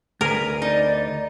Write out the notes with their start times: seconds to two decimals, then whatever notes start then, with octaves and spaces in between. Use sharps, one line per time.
0.21 D2 G#4 A#4 B4
0.62 D#4 D5